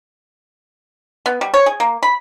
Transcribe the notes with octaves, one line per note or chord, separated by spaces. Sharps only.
B3
G3
C#5
G#4
A#3
B5